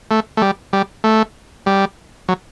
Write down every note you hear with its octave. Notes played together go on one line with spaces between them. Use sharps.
A3
A3
G3
G3
A3
G3
F#3